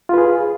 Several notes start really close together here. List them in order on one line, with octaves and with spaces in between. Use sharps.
F4 B4 G#4